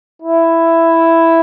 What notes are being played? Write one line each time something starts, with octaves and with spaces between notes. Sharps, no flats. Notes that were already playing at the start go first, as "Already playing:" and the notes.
E4